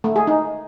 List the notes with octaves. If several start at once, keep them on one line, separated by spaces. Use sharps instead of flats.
A3
G#4
D#4